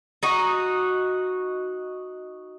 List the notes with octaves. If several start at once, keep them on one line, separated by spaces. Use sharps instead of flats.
D#4 F#4